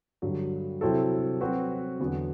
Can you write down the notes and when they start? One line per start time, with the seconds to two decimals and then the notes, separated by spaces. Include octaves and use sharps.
0.22 G2 D3 F#3
0.81 C3 F#3 C4 E4 A4
1.41 F#3 C4 F#4 B4
1.99 E2 D3 F#3 B3